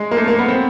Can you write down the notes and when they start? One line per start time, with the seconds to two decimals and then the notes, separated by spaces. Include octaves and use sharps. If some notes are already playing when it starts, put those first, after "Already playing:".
Already playing: G#3
0.11 A#3
0.17 A3
0.28 A#3
0.39 B3
0.48 C4